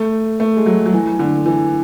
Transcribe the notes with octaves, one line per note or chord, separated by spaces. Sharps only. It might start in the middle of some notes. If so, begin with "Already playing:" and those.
Already playing: A3
A3
G#3
F#3
F#3
E3
D3
E3